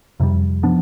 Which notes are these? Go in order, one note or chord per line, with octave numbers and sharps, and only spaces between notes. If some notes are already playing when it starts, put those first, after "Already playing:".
F2 C3 G3
F3 B3 D4